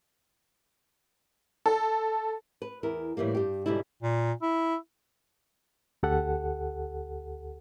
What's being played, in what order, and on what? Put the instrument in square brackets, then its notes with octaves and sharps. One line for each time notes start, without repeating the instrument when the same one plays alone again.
[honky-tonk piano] A4
[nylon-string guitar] B4
E2 E4 A#4
A2 E3 G3 A#3
G2 G4
G#2 B2 D3 G3 E4
[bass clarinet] A#2
E4
[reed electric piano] D2 G4 A4 F#5